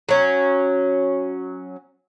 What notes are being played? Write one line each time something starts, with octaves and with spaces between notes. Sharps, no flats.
F#3 C#4